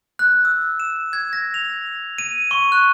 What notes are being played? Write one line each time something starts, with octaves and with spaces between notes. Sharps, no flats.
F#6
E6
E7
G#6
A#6
F7
D#7
C#6
F#6